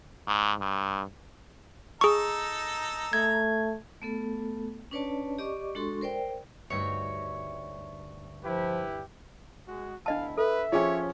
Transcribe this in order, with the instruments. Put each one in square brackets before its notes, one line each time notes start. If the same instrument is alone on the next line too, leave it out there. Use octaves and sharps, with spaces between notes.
[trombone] G#2
G2
[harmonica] D#4 A4 A#5 [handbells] G#4 C#6
[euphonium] A3 [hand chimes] G#6
[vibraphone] A3 B3 A4
C#4 D4 B4 C#5 D5 A5
G4 D5 D#5 C#6 D6
G#3 D4 F#4 A4 C6 C#6
A#4 C5 D5 G5
[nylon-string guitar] D2 G2 D#4 [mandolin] F#4 C#5 E5
[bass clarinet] F3 [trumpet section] E4 G4 B4
[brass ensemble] G#3 [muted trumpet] F#4
[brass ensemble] D2 B3 E4 [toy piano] D4 D#5 A5 [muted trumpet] F5
[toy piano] A4 [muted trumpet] B4 [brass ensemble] E5
[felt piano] F3 C#4 [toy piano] F4 G#4 G5 [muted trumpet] C#5